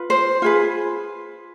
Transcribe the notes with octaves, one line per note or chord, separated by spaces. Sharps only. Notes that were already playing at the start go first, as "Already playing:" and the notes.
Already playing: F4 B4
C5
F4 G#4 B4